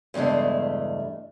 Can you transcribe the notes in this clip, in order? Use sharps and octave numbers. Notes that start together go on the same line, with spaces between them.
E2 G2 C#3 G#3 A3